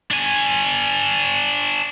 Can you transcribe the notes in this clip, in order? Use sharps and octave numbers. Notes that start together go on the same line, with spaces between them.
D4 G#5